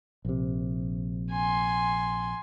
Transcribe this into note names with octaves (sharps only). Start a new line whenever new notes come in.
A#1 C3
G#5 C6